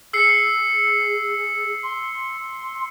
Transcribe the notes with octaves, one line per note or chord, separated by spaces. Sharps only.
G#4 E6 C7 C#7
C6